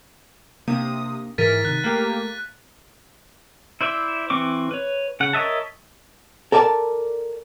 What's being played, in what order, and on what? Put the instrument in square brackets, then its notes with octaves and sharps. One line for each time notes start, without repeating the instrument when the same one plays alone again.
[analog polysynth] C3 D#6 [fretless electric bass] A#3 D4
[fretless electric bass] G#2 E3 [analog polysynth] A#4 [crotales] A6 B6 D#7
[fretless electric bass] C3 D#3 [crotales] F#6
[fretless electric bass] A3 [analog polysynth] A#3 G4
[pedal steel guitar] E4 C5 D5 E5
E3 C4 C#6 D6
B4 C#5
C#3 F#5
A#4 C#5 D#5 E5 A5
[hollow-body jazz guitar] A4 A#4 D5 G#5 A5